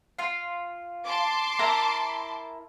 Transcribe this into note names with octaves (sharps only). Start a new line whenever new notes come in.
F4 F5
A5 C6 D6
E4 A#4 A#5